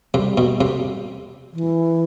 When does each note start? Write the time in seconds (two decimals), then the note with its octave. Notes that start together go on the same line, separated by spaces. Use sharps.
0.14 C3 G3
0.37 B2
0.61 C3
1.53 E3